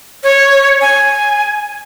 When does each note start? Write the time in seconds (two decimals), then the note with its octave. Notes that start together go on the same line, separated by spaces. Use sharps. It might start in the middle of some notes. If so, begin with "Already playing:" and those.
0.23 C#5
0.81 G#5